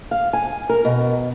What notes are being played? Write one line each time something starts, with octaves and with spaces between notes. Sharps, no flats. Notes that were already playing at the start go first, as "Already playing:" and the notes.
F5
G#5
A#4
B2